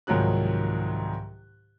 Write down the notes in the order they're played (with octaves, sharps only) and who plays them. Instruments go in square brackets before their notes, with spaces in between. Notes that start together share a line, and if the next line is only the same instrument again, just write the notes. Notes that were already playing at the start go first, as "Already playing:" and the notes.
[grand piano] C2 G#2 D#3 F3 F#3 F#6